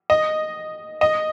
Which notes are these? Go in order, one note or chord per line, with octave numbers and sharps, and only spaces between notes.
D#5
D#5